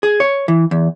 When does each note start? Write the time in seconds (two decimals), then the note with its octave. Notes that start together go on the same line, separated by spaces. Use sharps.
0.03 G#4
0.20 C#5
0.48 E3
0.71 E2